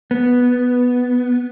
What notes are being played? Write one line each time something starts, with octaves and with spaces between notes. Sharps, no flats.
B3